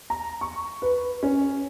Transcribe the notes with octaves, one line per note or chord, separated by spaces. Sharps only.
A#5
C#6
B4
C#4